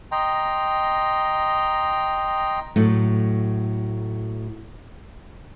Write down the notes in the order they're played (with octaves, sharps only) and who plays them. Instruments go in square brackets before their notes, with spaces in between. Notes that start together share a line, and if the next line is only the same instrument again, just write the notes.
[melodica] D#5 G5 A#5 C6
[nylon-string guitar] A2 F#3 A3 A4